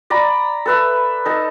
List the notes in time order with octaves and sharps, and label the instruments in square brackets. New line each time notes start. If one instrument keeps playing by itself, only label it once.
[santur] D5 A#5 B5
A4 B4 E5
D#4 A4